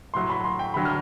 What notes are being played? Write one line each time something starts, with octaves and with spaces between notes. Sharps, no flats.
A2 F#3 C6
B5
C6
G5
D2 D3 F#3 B5
F6